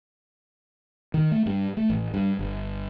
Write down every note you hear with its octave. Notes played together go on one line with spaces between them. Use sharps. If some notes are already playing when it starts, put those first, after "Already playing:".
D#3
A3
G2
A3
A1
G2
G1